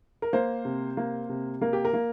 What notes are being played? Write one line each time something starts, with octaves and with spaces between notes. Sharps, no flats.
A#4
A#3 C5
C3
A#3
C3
A#3 A#4
G4
A#4
A#3